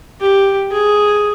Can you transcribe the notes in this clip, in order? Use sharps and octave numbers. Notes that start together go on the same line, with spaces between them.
G4
G#4